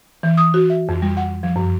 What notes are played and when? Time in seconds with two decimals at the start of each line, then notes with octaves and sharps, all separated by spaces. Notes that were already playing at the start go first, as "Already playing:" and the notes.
0.23 E3
0.38 D#6
0.54 F#4
0.70 E5
0.89 F2
1.02 G3
1.17 F#5
1.43 F3
1.56 F#2